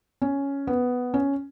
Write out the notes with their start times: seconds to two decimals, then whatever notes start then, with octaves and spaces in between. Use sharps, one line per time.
0.22 C#4
0.67 B3
1.14 C#4